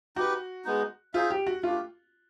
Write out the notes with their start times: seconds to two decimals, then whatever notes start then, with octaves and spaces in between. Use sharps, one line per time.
0.16 D#4 F#4 G4 B4
0.65 G#3 B3 D#4
1.14 D#4 F4 G#4 C5 E5
1.30 G4
1.47 F#4
1.63 A3 D4 F4 G4